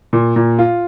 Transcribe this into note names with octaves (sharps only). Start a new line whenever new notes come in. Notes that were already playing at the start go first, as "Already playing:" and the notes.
A#2
A#2
F4